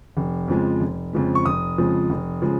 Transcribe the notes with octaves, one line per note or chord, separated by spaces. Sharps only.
F1
F2 C#3 F3 G#3
F1
F2 C#3 F3 G#3
C#6
F1 D#6
F2 C#3 F3 G#3
F1
C#3 F3 G#3